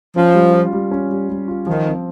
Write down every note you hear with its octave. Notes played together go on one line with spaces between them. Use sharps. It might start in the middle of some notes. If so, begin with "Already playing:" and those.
F3 C#4
G3
F4
G3
C#4
G3
G3
F4
D#3 F3
C4